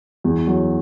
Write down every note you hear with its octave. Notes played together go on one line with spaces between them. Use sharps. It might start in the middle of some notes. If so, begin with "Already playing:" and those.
E2
F#3